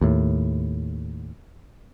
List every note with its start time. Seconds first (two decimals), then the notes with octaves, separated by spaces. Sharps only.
0.01 D#2 A2